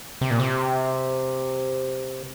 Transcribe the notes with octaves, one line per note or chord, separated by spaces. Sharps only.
C3
A#2
C3